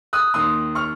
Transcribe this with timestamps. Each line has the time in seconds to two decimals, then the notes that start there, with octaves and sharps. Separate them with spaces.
0.13 D#6 F#6
0.34 D#2 D#3 C6 D#6
0.75 C#6 F6